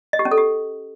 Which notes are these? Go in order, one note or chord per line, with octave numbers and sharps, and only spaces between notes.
D#5
G4
C#4
A4
G4